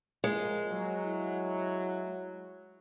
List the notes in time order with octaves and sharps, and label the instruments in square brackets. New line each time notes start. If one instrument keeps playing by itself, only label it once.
[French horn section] A#2 F3 A#3 [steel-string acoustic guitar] G#3
[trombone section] F#3
[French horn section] E4